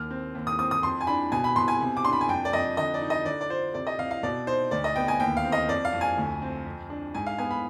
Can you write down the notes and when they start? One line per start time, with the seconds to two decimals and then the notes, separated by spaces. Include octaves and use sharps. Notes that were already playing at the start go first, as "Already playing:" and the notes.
Already playing: D#2 F6
0.10 C4
0.35 D#2
0.47 D#6
0.58 C4 D#6
0.71 D#6
0.83 F2 C6
1.01 G#5
1.07 D4 B5
1.32 B2 G#5
1.44 B5
1.56 B2 C6
1.68 G#5
1.80 C3
1.97 D6
2.04 D4 C6
2.13 B5
2.21 G#5
2.29 F2 G5
2.45 D5
2.53 F2 D#5
2.77 D3 D#5
2.94 D5
3.02 D#4
3.10 D#5
3.25 D3 D5
3.41 D5
3.50 F4 C5
3.74 C3 D5
3.87 D#5
3.99 C3 F5
4.11 F5
4.23 B2 D5
4.47 D#4 C5
4.71 D2 D5
4.84 D#5
4.96 B3 G5
5.08 G#5
5.20 D#2 G5
5.37 F5
5.45 C4
5.52 D#5
5.68 F2 D5
5.85 F5
5.92 F2
6.01 G#5
6.18 D2
6.42 C4
6.66 F2
6.90 D4
7.15 G#2 G#5
7.26 F5
7.38 B3 G#5
7.51 B5